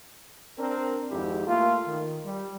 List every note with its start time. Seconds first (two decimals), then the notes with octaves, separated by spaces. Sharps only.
0.59 C4 D4 A#4
1.11 G#1 F2 G#2 E4 G4
1.47 A3 A#3 F4
1.87 D#3
2.25 G3